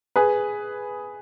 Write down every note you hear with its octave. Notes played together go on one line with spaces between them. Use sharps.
G#4 B4